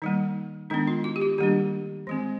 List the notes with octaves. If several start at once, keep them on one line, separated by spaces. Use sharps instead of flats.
D#3 G3 A#3 D#4
D#3 G#3 B3 D4 D#4
F4
F#4
G4
F#4
D#3 G3 A#3 D4 G4
E3 G#3 C4